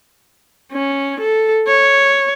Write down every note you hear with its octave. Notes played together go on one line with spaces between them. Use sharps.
C#4
A4
C#5